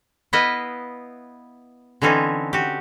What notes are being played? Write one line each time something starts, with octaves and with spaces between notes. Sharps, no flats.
B3 E4 B4 D#5 F5
D3 E3 C4 C#4 D#4
F#4 G4